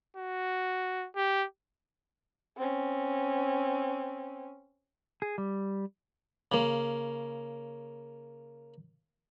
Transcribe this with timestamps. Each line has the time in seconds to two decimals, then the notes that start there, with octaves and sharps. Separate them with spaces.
0.17 F#4
1.16 G4
2.57 C4 C#4
5.22 G#4
5.38 G3
6.52 C#3 A#3